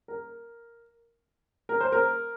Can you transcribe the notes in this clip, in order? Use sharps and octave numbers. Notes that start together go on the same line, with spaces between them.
A#4
A#4
C5
A#4